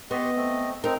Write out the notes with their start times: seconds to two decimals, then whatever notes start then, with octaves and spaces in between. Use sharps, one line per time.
0.11 B3 G4 D#5 C6 C#6
0.36 A3 C4
0.84 C4 D#4 A#4